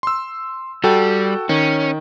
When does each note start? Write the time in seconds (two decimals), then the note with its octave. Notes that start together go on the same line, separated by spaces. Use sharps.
0.03 C6 E6
0.84 G3 F#4 A4 G5
1.49 D#3 C#4